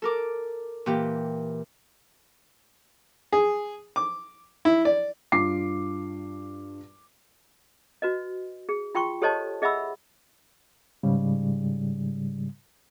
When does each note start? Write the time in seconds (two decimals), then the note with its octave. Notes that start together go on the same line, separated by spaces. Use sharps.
0.02 A4 A#4 D6
0.86 A#2 E3 G4
3.33 G#4
3.96 D6
4.65 E4
4.85 D5
5.32 G2 F4 D6 C7
8.02 F#4 B4 D#5
8.69 G#4
8.95 F4 G5 C6 C#6
9.22 G4 A4 C5 C#5 D#5 A5
9.62 G#4 D#5 E5 F#5 B5 E6
11.03 G#2 C#3 G3